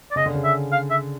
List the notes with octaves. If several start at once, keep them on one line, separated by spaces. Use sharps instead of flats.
D5
C#3 D#5
D3
C#3
E5
F5
E5